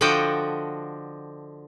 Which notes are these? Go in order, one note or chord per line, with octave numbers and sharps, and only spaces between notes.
D3 F3 F#4 A4 D#5 G5